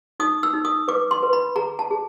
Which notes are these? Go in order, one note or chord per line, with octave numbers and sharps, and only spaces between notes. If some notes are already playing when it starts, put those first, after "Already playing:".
D#4 D#6
E6
D#4
D#6
B4 D6
C6
B4
B5
G#4 A#5
A5
G#4